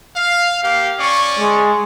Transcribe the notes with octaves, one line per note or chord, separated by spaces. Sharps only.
F5
A#3 G4 F5
C#4 D5 C#6
G#3